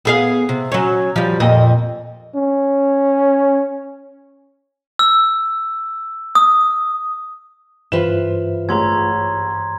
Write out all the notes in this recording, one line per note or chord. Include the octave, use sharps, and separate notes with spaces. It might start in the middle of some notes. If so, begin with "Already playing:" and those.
B3 G#4 F5
C3
F#3 C#4
F3 G3
F2 A#2 D#5
C#4
E6
D#6
G2 E3 F4 B4 C5 E5 E7
A1 G#3 A#5 C6 G#6